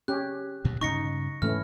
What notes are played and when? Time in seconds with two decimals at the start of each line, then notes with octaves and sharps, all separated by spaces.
0.08 C#4 G4 F#6
0.64 D2 G2 A#2
0.81 G2 C#3 C#4 D#4 C#6 A#6 C#7
1.42 G#2 E3 A3 C#4 F6